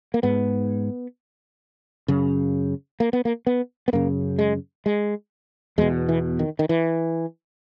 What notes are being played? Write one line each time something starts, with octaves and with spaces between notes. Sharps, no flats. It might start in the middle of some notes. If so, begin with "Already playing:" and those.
A#3
G#2 B3
F#2 C#3
A#3
B3
A#3
B3
B3
F#2 C#3 A#3
G#3
G#3
E2 B2 G#3
E3
D#3
D#3
E3